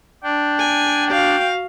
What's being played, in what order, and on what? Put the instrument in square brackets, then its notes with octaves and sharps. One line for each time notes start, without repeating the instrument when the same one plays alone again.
[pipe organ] D4 [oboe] G5
[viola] G#5
[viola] F#4 F5 [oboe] G5